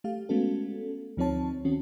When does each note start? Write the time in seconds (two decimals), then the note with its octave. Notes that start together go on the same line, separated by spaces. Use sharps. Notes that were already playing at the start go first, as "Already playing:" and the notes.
0.04 A3 G4 F5
0.29 G#3 A3 B3 C#4 F#4 A4
1.17 D2 F3 C4 D#4 C#5 A5
1.65 D#3 C4 C#4 F#4